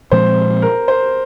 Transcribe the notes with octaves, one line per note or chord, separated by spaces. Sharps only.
A#2 F3 G#3 C4 C5
A#4
C5